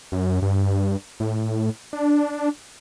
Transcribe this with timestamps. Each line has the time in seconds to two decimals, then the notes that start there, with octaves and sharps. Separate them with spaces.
0.12 F#2
0.42 G2
1.20 A2
1.93 D4